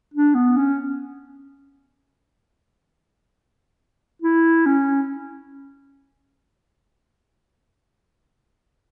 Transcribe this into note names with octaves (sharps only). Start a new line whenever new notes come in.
D4
B3
C#4
E4
C#4